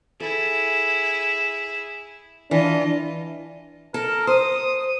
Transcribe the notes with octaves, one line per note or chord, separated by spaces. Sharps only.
E4 G#4 A4
E3 D4 F4 D#5
A4 A#4
C5 D#6